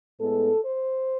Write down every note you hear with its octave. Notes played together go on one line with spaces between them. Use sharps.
A2 G#3 B3 A4
C5